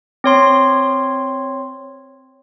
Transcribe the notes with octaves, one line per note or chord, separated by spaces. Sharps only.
C4 C#5 C6